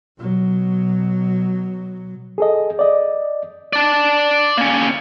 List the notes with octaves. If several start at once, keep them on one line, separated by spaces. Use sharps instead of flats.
B2 F#3
G#4 A4 D#5
D5 D#5
D5 A5
A#3 C#4